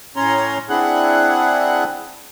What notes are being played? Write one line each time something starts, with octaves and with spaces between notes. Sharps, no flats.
A2 C#4 C#5 A#5 C6
C4 D4 E4 G#4 F#5 F#6